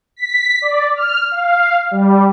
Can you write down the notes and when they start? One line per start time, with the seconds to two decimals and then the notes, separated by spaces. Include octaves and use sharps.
0.16 B6
0.62 D5
0.96 F6
1.31 F5
1.91 G3